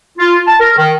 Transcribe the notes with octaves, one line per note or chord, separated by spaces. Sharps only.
F4
A5
A#4
D#3